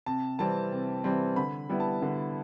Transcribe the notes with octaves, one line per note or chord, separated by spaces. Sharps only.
C3 A5
E3 G3 C4 A5
C3
E3 G3 C4
D3 B5
G3 B3 E4
A5
D3